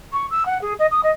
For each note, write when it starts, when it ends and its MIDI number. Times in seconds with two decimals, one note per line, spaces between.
0.13 0.26 85
0.30 0.44 88
0.46 0.61 78
0.61 0.73 68
0.79 0.86 75
0.91 1.00 87
1.03 1.10 75